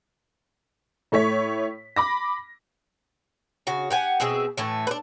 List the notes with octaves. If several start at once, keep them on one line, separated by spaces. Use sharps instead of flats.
A2 A3 C#5 B6
B5 D6 A#6
C#3 F#4
G4 F#5 G#5
B2 C4 G#4 E5
A2 E3 A3
D4 B4